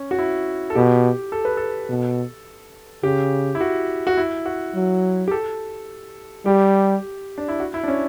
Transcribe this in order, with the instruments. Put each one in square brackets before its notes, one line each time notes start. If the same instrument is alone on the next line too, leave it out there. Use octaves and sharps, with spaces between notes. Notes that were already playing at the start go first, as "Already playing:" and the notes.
Already playing: [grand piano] C#4
F#4
E4
A4
[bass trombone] B2 [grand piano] G4
[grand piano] A4
B4
A4
[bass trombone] B2
[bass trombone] C#3 [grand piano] G4
[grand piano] E4
F#4
F#4
E4
F#4
[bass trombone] F#3
[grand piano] G4
A4
[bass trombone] G3 [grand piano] G4
[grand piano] D4
E4
F#4
E4
D4
C#4